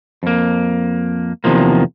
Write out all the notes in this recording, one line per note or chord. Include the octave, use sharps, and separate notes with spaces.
F2 A#3
E2 C3 D#3 F3 A#3